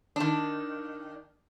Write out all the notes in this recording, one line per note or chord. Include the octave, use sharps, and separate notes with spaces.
D#3 D4